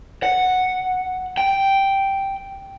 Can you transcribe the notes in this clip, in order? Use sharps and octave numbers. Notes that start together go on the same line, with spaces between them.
F#5
G5